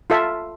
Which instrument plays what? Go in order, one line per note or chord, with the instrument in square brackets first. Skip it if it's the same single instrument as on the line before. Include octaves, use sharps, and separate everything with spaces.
[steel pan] F4 A4 E5